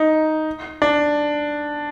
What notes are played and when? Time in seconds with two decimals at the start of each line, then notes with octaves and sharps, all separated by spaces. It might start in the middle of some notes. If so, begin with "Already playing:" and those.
Already playing: D#4
0.82 D4